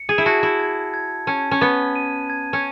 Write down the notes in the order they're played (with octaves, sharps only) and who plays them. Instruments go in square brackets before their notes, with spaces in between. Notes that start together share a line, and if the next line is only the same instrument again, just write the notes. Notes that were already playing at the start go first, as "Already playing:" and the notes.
Already playing: [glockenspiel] C#7
[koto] G#4
E4
[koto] F#4 [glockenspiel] A5
[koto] E4
[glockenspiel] G#6
G#6
[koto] C#4 [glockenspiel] A5
[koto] C#4
[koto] B3 [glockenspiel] G#6
[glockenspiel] D#7
G#6
[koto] C#4